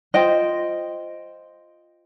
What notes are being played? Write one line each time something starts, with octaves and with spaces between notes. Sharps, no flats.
F4 C5 D#5 G5